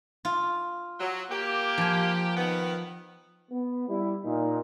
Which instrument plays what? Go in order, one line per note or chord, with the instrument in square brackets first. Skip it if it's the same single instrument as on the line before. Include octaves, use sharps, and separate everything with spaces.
[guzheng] F4
[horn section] F#3
A#3 G4
[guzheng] F3 G#5
[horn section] D#3 B3
[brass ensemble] B3
G3 E4
A#2 D#4